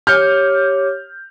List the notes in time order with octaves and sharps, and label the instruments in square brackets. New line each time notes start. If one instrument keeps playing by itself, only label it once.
[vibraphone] G4 C#5 D6 [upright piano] F6 G6